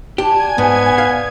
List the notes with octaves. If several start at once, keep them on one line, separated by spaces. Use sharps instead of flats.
D4 G4 G#5 A5 G#6
G#2 B3
F5